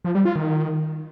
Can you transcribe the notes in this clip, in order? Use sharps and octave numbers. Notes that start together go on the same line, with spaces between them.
F3
G3
F4
D#3